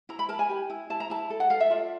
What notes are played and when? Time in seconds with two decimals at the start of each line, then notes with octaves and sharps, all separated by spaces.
0.09 E4 A#5
0.19 B5
0.29 A#4 A5
0.39 G#5
0.49 G4
0.70 E4
0.90 E4 A5
1.00 A#5
1.10 E4 A5
1.30 A4
1.40 F#5
1.50 A4 F5
1.60 E5
1.70 F4 D5